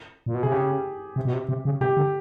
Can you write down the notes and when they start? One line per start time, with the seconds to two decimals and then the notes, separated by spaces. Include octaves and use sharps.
0.26 A#2
0.35 B2
0.43 C3 G#4
0.52 C#3 G4
1.16 C3
1.25 B2
1.33 C3
1.49 C3
1.65 C#3
1.81 C3 G4
1.97 D3